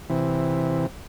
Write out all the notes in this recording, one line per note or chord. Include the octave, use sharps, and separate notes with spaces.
C3 E3